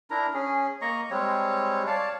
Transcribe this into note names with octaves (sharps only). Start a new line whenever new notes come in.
D4 E4 A#4 A#5
C#4 G#4
A#3 D#5 A#5 C#6
G3 G#3 C4 C#5
C#5 D5 F5 A5